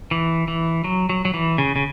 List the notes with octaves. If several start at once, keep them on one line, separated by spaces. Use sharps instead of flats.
E3
E3
F#3
F#3
F#3
E3
C#3
C#3